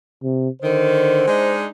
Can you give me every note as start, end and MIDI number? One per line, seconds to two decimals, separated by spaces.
0.23 0.49 48
0.62 1.24 50
0.62 1.24 51
0.62 1.56 72
1.27 1.66 56
1.27 1.66 62
1.27 1.66 63